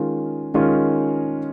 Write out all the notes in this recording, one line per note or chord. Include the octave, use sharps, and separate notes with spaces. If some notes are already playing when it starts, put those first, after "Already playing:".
Already playing: D#3 G#3 C#4 F4
D#3 G#3 C#4 F4